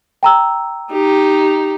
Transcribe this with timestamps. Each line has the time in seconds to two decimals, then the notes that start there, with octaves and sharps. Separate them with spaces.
0.23 G5 A#5 E6
0.92 D#4 G4